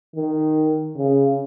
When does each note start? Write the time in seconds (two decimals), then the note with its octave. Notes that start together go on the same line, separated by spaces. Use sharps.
0.16 D#3
0.97 C#3